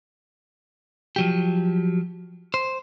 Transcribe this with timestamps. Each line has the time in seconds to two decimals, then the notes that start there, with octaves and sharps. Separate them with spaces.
1.16 F3 F#3 G4
2.54 C5